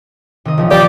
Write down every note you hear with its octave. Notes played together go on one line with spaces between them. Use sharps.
C3 D#3 D#5
A#1 C#3 F3
F3 G4 D5 G6